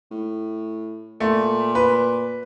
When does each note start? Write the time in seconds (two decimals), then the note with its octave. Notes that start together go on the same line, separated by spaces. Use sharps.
0.11 A2
1.20 A#2 A3
1.75 B4